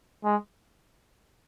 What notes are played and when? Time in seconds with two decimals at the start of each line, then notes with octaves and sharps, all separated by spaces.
0.24 G#3